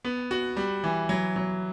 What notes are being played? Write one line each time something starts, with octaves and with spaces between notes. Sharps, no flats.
B3
F#4
G3
E3
F#3
F#3